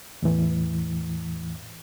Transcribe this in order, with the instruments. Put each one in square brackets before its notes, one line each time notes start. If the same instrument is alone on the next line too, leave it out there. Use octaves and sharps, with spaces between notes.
[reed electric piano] E2 A2 E3